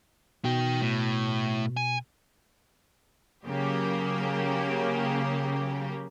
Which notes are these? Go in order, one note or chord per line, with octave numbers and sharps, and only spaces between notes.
B2 D#4 G5
A2
G#5
C#3 F#3 A#3 G4